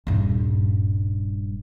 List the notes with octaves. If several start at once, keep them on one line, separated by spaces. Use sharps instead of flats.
D#1 G2